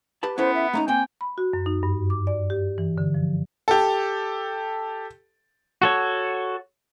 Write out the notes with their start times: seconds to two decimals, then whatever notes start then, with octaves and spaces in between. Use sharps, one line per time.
0.23 G4 B4 A5
0.38 B3 C#4 E4 A4 C5
0.55 E5
0.73 A3 C#4 D#4 A#5
0.88 A#3 C4 G5 G#5
1.21 B5
1.38 F#4
1.53 F#2
1.66 D#4
1.83 G2
2.10 D6
2.27 D5
2.50 G4
2.78 E3
2.98 D3
3.14 F3
3.68 G4 A4
5.82 F#4 A4 C#5